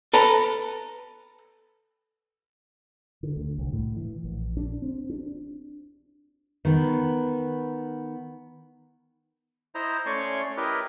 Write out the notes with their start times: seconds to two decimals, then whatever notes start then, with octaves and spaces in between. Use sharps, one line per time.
0.13 A4 B4 A#5
3.23 D3
3.36 D2
3.58 C2
3.73 A2
3.96 E3
4.24 A#1
4.57 D4
4.82 C4
5.10 D4
6.65 D#3 B3
9.75 E4 C5 D#5 A#5
10.06 A3 C#4 C#5 D5 G#5 C6
10.57 E4 G4 A#4 B4 D#5